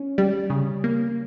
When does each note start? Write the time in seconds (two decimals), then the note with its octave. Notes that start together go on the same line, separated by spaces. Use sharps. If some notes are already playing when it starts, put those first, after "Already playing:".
Already playing: C#4
0.18 G3
0.50 C#3
0.84 A#3